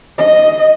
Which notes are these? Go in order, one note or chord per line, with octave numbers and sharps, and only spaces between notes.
D#5